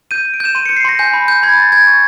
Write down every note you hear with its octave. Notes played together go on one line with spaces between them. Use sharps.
G6 D#7
G6
D7
G6 E7
C6 D#7
C#7
G6
C7
C6 A#6
G#5 G6
B5
G6
B5 G#6
B5 A6
G6 G#6
C#6